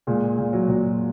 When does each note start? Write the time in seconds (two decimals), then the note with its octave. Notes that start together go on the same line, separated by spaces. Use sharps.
0.07 A#2 G#3
0.38 A#2
0.53 F#3
0.68 A#2